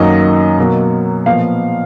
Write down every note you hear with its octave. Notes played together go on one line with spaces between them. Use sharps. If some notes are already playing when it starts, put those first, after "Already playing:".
Already playing: F#2 D#3 F#3 A#3 D#5
B2 F#3 A#3
A#2 F3 B3 F5